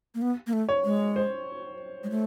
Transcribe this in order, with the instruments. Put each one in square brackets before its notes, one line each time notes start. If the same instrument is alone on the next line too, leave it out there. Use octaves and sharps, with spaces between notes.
[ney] A#3
B3
A#3
A3
[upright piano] C#5
[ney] G#3
[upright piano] C5
[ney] G#3
A3